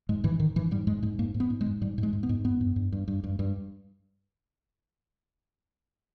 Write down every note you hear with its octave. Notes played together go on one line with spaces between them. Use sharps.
G#2 G#3
G#2 E3
G#2 D#3
G#2 E3
G#2 G3
G#2 G#3
G#2 G#3
G#2 A#3
G#2
B3
G#2
G#3
G#2
G#2 G3
G#2
G#3
G#2
B3
G#2
G2 B3
G2
G2
G2
G2
G2
G2